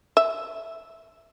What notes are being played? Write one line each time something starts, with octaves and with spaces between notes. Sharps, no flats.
E5